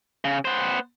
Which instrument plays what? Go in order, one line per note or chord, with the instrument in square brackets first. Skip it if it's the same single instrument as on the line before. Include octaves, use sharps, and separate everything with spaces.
[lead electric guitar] C#3
B3 C5